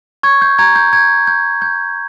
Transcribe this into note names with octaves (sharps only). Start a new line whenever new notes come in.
C#6 G#6
G6
A#5 G#6
G6
G6 G#6
G6
G6